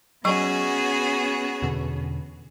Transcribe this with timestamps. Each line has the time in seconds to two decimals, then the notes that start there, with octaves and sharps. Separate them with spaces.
0.25 F#3 B3 C#4 F#4 G#4 C#6
1.62 E2 B2 D3